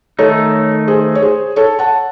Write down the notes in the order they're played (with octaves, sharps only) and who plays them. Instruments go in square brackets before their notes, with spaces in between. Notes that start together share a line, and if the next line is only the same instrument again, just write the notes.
[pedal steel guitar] D#3 A3 D#4 [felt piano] A4 C#5
[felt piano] G#4 C5
C#5
G#4 C5
A4 C#5
F#5 A5